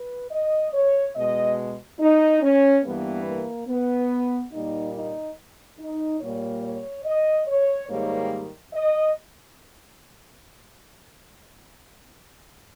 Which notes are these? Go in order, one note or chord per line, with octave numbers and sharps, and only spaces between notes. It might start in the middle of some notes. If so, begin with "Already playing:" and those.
Already playing: B4
D#5
C#5
B2 G#3 D#5
D#4
C#4
G2 E3 G3 A#3 B3
A#3
B3
A#2 G3 A#3 D#4
D#4
D#4
A#2 G3 A#3 C#5
C#5
D#5
C#5
G#2 D#3 G3 A#3 C#5
D#5